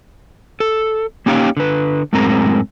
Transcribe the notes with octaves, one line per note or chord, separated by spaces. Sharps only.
A4
A#3 C#4 D#4 G4 C#5 F5
D3 B4
F#2 A2 G#3 C4 A#4 A#5